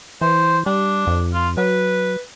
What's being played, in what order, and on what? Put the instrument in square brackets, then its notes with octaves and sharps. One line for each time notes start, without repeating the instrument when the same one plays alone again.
[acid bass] E3 [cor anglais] C5
[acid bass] G3 [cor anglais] D4
[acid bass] F2
[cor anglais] F4
[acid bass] F#3 [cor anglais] B4